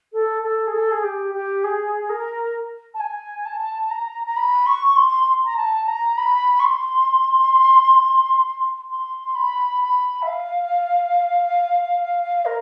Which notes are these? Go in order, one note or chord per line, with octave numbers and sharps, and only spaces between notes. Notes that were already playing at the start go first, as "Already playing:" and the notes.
A4
A4
G#4
A4
G#4
G4
G4
G#4
A#4
A5
G#5
A5
A#5
A#5
B5
C#6
C6
A#5
A5
A#5
B5
C#6
C6
C6
B5
B5
E5
F5
A#4